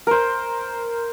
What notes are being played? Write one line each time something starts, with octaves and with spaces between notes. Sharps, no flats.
A#4 C5